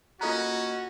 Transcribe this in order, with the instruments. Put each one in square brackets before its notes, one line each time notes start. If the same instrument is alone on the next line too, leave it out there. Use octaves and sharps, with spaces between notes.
[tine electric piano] A#3 D#5 F#6 [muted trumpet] C#4 [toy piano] F4 A4 A#5 [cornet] F#4